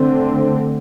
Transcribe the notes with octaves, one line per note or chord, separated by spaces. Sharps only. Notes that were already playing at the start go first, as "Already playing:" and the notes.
Already playing: D3 A3 C4